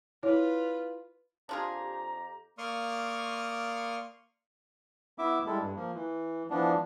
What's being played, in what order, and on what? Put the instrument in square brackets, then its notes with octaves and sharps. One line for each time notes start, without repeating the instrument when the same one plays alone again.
[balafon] E4 C#5 [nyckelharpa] F4 B4
[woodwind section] F2 G4 A#5 [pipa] D4 F4 G#4
[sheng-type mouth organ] A#3 D5 C6 C#6 D#6 F6
[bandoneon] B3 E4 E5 D6
G3 G#3 E4 A4
G2
F3 A#3
E3
E3 F3 B3 D4